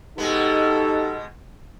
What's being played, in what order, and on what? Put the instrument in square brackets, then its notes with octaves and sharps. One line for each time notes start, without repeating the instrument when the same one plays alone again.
[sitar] B2 G#3 B3 [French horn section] D#4 G4 [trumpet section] A4